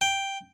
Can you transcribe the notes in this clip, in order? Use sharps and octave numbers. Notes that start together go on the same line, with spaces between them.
G5